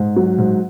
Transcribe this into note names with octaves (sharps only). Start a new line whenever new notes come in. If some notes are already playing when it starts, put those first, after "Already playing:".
Already playing: G#2
F#3
G#2